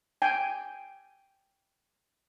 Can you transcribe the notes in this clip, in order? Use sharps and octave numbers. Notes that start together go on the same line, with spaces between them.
G5 G#5